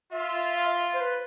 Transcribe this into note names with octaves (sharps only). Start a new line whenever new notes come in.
F4 E5
C5
B4